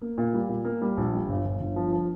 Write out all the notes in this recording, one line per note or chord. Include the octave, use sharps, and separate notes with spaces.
A#3
A#2
G3
A#2
A#3
G3
A#1
G3
G1
G1
G1
F3
F3